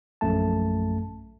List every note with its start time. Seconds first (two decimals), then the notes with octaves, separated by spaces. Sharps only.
0.21 A#1 F#2 A3 A5